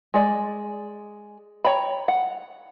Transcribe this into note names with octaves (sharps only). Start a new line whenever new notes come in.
G#3 D5
C#5 G5 A#5 B5
F#5